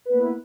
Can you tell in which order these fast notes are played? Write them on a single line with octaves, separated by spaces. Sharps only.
B4 B3 A#3 E4